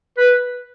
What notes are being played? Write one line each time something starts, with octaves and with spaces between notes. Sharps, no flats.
B4